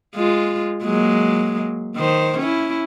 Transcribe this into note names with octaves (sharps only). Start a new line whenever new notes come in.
G#3 F4
F#3 G#3 A#3
D#3 C5
C#4 E4